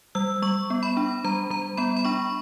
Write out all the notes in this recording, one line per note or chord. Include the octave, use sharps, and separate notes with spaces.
G3 E6
G3 C#6
B3
B5
D4
G3 A#5
G3 A#5
B3 B5
B5
D4 C#6